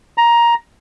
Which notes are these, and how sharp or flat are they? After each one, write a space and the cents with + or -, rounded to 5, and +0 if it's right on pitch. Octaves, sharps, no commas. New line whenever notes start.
A#5 +10